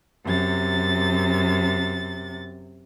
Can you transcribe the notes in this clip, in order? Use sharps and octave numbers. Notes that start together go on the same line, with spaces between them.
F#2 C3 A6